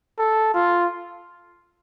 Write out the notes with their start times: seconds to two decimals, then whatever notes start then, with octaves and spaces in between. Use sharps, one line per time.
0.18 A4
0.54 F4